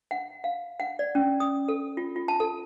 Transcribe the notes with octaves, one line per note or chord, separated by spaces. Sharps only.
F#5
F5
F#5
D5
C#4
D#6
A4
F4
F4
A5
A4